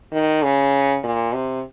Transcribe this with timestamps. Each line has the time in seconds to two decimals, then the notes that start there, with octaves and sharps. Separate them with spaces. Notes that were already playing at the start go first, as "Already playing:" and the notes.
0.12 D#3
0.43 C#3
1.04 A#2
1.34 C3